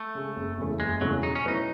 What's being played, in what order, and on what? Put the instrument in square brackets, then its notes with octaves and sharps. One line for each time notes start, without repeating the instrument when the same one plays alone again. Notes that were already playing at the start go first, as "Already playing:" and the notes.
Already playing: [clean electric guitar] A3
[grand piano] C#3 G#3
F#1
E2 C#3 E3 A3
[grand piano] F#1 [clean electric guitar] G#3
[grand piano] E2 C#3 E3 A3 [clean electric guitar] F#3
[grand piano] B2 [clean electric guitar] D#4
[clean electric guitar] C#4
[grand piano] F#3 A3 E4 B4 [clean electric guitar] D#4